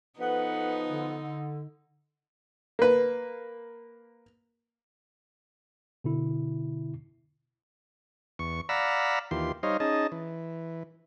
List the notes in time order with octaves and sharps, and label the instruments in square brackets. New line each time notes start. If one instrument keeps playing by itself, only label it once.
[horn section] F3 B3 [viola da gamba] D#4 [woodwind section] A4 B4 F#5
[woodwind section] D3
[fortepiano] A#3 B4
[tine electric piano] B2 D3 E4
[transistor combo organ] E2 C#6
D5 F5 F#5 A#5 B5 E6
D#2 E3 F4 G4 C6
G3 D#4 C5 C#5 D#5 F5
C#4 D#4 G#4 D#5 A5
E3